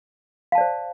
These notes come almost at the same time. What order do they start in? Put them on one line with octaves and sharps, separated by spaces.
F5 A5 D5 C5